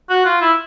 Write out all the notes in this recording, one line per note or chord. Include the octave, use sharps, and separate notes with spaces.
F#4
F4
E4